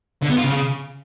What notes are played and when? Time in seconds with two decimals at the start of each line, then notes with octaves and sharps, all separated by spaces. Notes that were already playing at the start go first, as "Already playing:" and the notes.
0.22 D3
0.30 B3
0.37 F4
0.44 C#3